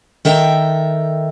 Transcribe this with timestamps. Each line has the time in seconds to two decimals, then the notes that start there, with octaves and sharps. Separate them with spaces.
0.25 D#3 A4 E5 G5 A#5